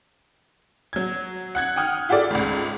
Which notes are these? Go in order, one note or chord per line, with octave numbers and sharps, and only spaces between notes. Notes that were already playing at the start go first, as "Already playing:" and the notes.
F#3 G#6
F#5 F#6 G#6
F#5 G5 D#6 F6
E4 F4 G4 A4 D5
G#1 C#2